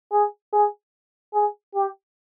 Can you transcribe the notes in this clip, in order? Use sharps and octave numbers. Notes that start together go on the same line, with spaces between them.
G#4
G#4
G#4
G4